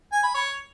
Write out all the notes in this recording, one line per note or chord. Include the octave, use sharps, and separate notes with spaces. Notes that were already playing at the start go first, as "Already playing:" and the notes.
G#5
B5
C#5